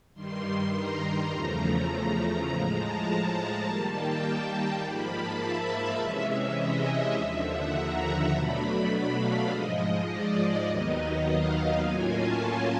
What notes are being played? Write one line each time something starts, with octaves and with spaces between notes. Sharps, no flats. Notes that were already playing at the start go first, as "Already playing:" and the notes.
G2 D#3 G3 C6
A#5
A#5
E2 C#3 F3 A3
A#5
A2 F3 G#3
A5
A5
D#3 G3 A#3
G5
A5
G#2 F3 A#3 B5
A5
E5
C3 E3 G#3 C#4
D#5
E5
D#2 D3 F3
F#5
A#5
B2 F#3 A3 D4 B5
B5
F5
G#2 F3 G#3 D#5
D5
D#2 D#3 F#3 B3 D#4 D#5
F5
A2 F#3 A#3 C#4 F4 G#5
A5